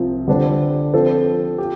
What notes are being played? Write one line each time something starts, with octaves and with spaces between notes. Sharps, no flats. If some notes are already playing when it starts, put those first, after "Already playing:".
Already playing: C2 C3 F3 C4
D3 G3 D4 A4 C5
F3 C4 A4 C5
G4